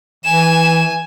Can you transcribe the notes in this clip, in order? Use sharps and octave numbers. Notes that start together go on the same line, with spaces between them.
E3 G#5 E7